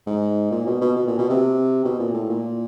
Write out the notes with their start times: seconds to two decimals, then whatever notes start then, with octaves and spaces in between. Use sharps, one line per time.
0.07 G#2
0.51 A#2
0.67 B2
0.81 B2
0.96 B2
1.07 A#2
1.18 B2
1.29 C3
1.85 B2
1.99 A#2
2.14 A2
2.29 A#2